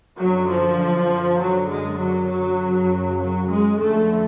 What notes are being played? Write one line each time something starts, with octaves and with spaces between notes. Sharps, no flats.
F#2 D3 F#3
F3
F#2 D3 F#3
G#3
F#3
F#2 C#3
F#3
G#3
F2 D3 A3